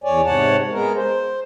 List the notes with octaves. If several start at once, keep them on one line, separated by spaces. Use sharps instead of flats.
E2 C#5 D5 G#5
G#2 C3 C#5 F#5 A5
G#3 B3 A#4
C5